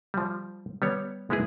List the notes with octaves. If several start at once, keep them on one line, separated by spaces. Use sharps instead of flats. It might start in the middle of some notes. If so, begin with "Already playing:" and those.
F3 G3
G3 B3 C#5
G#3 B3 E4 G#4